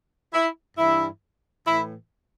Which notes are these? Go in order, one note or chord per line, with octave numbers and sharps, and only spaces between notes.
E4
G2 E3 E4
A2 E3 E4